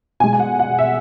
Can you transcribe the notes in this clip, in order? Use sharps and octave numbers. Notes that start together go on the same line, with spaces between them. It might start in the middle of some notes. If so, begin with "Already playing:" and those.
B2 G#3 G#5
G#5
F#5
F#5
E5